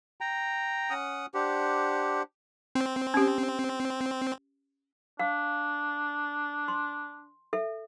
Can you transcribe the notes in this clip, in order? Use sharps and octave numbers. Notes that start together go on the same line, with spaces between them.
G5 A#5
C#4 F#5 D#6
D4 G4 C5 F#5
C4
C#4 G4
D4 F5
C6
A4 E5